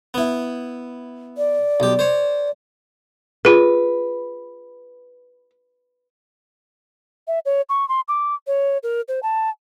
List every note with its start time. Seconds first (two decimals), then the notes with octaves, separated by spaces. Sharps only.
0.14 B3 E4
1.38 D5
1.80 B1 G4
1.99 C5 C#5
3.45 F4 G#4 B4
7.27 E5
7.45 C#5
7.69 C#6
7.89 C6
8.08 D6
8.47 C#5
8.83 A#4
9.08 C5
9.23 A5